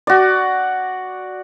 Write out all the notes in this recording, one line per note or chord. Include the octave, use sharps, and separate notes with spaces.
F#4 D5